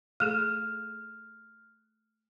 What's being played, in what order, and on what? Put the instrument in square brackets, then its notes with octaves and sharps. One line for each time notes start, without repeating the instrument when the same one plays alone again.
[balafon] A3 G#4 A4 [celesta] F6 F#6